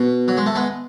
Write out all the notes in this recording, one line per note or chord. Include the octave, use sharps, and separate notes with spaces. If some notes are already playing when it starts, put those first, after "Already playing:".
Already playing: B2
F#3
G#3
A3
G#3 B3